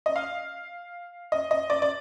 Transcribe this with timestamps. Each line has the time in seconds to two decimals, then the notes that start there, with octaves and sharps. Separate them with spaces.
0.06 D#5
0.16 F5
1.32 D#5
1.51 D#5
1.70 D5
1.82 D5